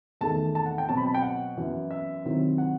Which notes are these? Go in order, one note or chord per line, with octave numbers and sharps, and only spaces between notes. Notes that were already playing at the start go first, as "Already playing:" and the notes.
E2 D#3 A3 A5
A5
F#5
G5
B2 F#3 C4 A5
B5
A5
G5
F#5
F#2 E3 B3
E5
C3 D#3 F#3 C4 E4
F#5